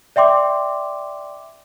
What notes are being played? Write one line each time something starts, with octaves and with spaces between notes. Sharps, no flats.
D5 E5 G5 C6 D6